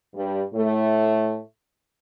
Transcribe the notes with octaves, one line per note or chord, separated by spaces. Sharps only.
G2 G3
A2 A3